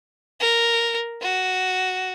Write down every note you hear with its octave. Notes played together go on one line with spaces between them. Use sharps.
A#4
F#4